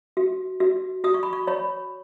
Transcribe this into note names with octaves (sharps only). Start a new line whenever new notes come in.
F#4
F#4
F#4 D#6
C#6
B5
C#6
C#5 B5